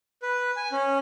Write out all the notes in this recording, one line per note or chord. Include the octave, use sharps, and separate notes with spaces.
B4
G#5
C#4